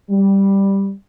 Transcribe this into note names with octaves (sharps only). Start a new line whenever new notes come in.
G3